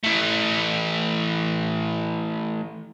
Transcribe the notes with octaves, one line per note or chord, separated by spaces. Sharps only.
E3 A3